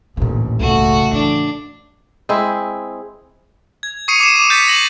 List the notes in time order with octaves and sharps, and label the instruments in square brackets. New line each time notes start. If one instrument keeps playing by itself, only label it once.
[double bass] A1 D#2 [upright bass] A#2 D3
[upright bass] E1 C#2 [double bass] C#3 A3 [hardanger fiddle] F#4
[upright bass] E3 [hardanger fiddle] D4
[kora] G#3 C4 E4
[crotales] G#6
C#6 D#6 C7 C#7 D#7
D6 C7 D#7 E7
D6
G6 A6 B6
A#6 F#7